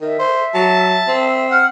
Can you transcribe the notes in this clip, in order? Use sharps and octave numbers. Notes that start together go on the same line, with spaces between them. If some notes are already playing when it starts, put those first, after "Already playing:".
D#3 E5
C5
F#3 A5
C4
F#5 F6